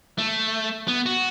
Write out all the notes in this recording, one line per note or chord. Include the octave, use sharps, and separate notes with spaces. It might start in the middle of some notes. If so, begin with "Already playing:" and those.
A3
B3
F#4